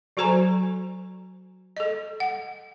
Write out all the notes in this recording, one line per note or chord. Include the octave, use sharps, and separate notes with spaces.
F#3 F#4 A4 C5 G#5 A#5
A4 D#5
F#5